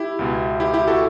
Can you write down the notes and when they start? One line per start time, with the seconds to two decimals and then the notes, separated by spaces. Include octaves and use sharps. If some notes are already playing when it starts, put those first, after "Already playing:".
Already playing: E4 G4
0.19 C#2 B2
0.60 E4 G4
0.74 E4 G4
0.88 F#4 A4